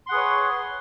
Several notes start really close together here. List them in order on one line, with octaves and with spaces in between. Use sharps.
C6 F#5 G#4 B4 C#5